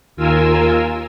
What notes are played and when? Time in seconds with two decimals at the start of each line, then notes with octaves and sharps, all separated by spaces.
0.17 D#2 F4 A#4 G#5 E6